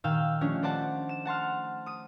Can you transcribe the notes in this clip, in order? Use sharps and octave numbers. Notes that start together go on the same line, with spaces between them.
A#2 D#3 F5 G5 E6
F3 A3 C#4 D4
A4 C5 D5 F#5 A5
E7
F#5 A5 C6 F6
D#6 D#7